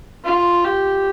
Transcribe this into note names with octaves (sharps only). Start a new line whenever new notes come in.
F4
G4